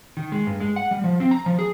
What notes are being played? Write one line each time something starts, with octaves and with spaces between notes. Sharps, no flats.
D#3
G#3
G2
G#3
F#5
G3
F3
C4
A#5
F3
G#4